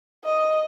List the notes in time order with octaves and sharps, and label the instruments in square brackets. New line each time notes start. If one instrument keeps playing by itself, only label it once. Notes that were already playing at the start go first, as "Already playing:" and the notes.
[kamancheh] D#5